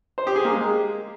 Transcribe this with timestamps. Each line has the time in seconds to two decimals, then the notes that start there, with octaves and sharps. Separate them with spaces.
0.18 C5
0.27 G4
0.36 G#4
0.45 A#3
0.54 G#3